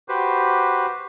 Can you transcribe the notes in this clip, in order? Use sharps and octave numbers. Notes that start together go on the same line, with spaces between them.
F#4 G4 B4 C5